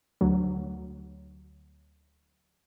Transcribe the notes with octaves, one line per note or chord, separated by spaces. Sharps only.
D2 F#3